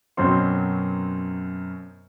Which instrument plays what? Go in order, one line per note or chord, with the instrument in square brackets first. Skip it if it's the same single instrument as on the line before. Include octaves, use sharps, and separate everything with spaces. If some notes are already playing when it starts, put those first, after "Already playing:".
[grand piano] F#2 B2 F#3 C4 C5 C6